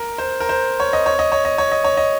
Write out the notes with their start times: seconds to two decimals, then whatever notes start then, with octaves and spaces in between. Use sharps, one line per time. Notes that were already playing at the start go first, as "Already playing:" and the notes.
Already playing: A#4
0.18 C5
0.40 A#4
0.49 C5
0.80 C#5
0.93 D#5
1.06 C#5
1.19 D#5
1.32 C#5
1.45 D#5
1.58 C#5
1.72 D#5
1.84 C#5
1.97 D#5